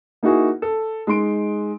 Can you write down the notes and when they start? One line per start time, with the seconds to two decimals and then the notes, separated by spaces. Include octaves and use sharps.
0.23 A#3 D#4 E4 F#4 G#4
0.62 A4
1.07 G#3 D#4 C6 D7